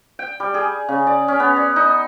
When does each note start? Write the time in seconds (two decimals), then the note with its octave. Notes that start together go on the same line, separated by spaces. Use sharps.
0.19 G5
0.40 G3
0.54 G#4
0.89 C#3
1.07 D5
1.28 C#4
1.40 B3
1.56 D5
1.76 D#4